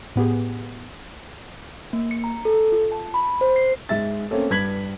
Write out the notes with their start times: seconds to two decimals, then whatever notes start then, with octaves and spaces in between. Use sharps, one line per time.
0.16 A2 B3 G4 G#4
1.93 A#3
2.11 C#7
2.24 A#5
2.45 A4
2.72 F4
2.92 A5
3.14 B5
3.41 C5
3.56 C7
3.89 G#2 G#3 E5 A6
4.31 A3 A#3 C4 C#4 A4
4.50 G2 B4 G#6 B6 F#7